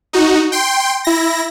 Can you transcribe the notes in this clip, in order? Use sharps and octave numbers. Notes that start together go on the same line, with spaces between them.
D#4 F#4
G5 C6
E4 A#6